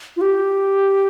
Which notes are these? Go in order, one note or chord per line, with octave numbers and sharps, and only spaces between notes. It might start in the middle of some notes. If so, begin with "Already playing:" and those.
F4
G4